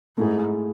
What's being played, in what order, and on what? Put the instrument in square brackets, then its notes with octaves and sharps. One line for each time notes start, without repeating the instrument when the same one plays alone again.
[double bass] G#2 [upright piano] A3 E4 G#4